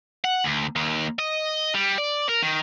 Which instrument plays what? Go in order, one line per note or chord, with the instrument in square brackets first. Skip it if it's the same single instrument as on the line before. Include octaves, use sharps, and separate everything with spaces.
[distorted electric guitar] F#5
D2
D#2
D#5
G3
D5
A#4
D#3